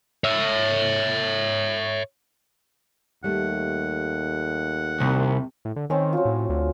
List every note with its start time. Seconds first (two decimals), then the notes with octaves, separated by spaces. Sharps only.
0.24 C#5 E5
3.24 D#2 G3 A3 F#5
5.00 C2 C3
5.65 A2
5.76 D3
5.90 D#3 C4 C#4 C#5
6.13 F#3 F4
6.25 A2
6.49 D2